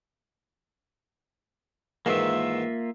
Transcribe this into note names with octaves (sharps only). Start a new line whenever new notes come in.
G#2 D#3 E3 A#3 F4 E5